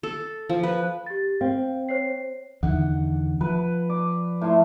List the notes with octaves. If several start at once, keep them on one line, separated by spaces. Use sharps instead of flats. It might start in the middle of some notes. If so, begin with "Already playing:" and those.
A4
F3
B4
G4 A6
C4 F5
C5 C#5 C7
E2 D3 D#3 F#5
F3 B4
D5
A2 C6